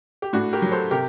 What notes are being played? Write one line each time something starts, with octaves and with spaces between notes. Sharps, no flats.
G4
A2 D4 F#4
G4 A#4
F#3
A4 C5
C3 G4 A#4